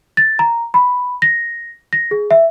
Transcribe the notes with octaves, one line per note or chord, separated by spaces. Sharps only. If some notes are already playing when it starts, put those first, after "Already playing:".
A6
A#5
B5
A#6
A#6
G#4
E5